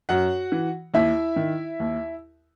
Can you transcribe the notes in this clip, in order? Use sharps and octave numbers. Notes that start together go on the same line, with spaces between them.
F#2 F#4 F#5
E3
D#2 E4 E5
D#3
D#2